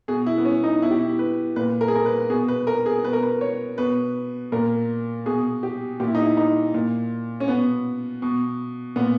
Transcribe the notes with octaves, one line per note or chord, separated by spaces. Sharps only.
B2 G#4
E4
B3
C#4
D#4
B2 E4
G4
E4
B4
A#2 B4
A#4
G#4
A#4
B4
B2 G#4
B4
A#4
G#4
B2 B4
A#4
B4
C#5
B2 B4
A#2 A#4
B2 G#4
G4
A#2 G4
E4
D#4
E4
D#4
A#2
C#4
B2 B3
B2
A#2 B3